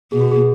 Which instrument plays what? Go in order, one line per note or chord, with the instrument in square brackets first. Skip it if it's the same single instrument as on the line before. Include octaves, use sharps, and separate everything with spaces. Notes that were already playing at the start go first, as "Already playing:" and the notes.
[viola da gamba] B2 [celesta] G#4
[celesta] F#4
G#4